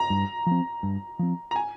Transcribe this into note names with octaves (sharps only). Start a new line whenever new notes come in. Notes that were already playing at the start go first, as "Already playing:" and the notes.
Already playing: A#5
G2
F3 C4
G2
F3 C4
A#5
G#5